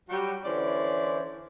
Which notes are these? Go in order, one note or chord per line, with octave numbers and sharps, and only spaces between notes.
F#3 G3 F#4 G4
D3 E3 C#4 E4 C5 D5